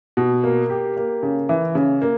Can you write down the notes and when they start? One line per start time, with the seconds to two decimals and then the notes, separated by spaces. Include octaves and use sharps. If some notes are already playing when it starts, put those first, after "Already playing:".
0.17 B2
0.44 A#3
0.70 G4
0.97 A#3
1.23 C#3
1.49 E3
1.75 C#3
2.02 A#3